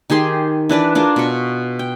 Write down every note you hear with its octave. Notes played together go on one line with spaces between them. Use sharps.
D#3 G4 G#4 C6
E3 D4 B4 D5
D4 F4 G#4 A#4
B2 C#6
G5